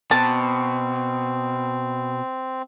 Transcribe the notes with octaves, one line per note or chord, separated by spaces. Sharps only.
B2 C4 A5